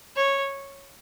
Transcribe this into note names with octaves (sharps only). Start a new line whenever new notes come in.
C#5